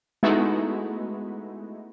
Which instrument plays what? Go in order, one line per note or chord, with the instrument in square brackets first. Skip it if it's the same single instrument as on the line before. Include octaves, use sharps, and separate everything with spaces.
[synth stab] G#3 A3 B3 D#4 E4 F#4